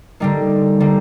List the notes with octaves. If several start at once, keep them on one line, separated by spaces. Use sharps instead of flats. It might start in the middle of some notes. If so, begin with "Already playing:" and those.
D3 G3 A#3 D#4
D3 G3 A#3